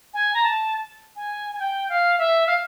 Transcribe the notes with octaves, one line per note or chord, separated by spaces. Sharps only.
G#5
A#5
A5
G#5
G#5
G5
F5
E5
F5